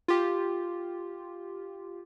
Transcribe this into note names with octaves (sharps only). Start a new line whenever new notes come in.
F4 G4